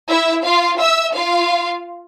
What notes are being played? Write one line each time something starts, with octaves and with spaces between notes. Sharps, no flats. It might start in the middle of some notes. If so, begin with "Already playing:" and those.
E4 E5
F4 F5
E5 E6
F4 F5